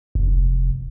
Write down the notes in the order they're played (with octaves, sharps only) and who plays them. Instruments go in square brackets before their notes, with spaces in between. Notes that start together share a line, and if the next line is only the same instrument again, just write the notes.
[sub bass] F1